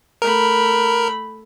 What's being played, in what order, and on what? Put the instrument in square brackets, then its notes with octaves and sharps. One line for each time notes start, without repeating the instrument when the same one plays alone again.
[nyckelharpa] A3 B5 [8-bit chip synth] A#4